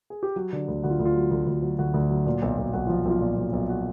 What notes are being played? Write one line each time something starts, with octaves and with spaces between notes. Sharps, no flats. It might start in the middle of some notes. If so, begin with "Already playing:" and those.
G#4
G4
F#3 F#4
D3
D2
D2 F#4
F4
D2
F4
F#3
D2
D2
F#3
D2 F#4
D2
F#3
A#2
B1
B1
B1 F#4
F3 F4
B1 F4
A#2
B1
B1
F#4